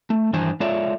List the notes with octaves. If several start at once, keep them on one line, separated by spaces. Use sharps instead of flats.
A3
G2 D#3 E3 D4 C5 G#5
G#3 F4 A4 C#5 D5 E5